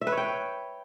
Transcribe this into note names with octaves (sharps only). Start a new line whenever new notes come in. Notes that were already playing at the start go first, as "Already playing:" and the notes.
E5
B4
C#5
G5